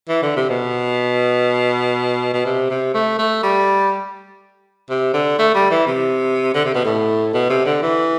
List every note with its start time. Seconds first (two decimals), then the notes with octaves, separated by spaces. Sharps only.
0.08 E3
0.22 D3
0.36 C3
0.50 B2
2.33 B2
2.45 C3
2.70 C3
2.94 A3
3.18 A3
3.43 G3
4.90 C3
5.13 D3
5.39 A3
5.54 G3
5.71 E3
5.87 C3
6.54 D3
6.64 C3
6.74 B2
6.85 A2
7.34 B2
7.49 C3
7.66 D3
7.82 E3